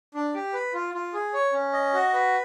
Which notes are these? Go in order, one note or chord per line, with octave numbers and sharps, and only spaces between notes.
D4
G4
B4
F4
F4
G#4
C#5
C#4
D#5
F#4
B4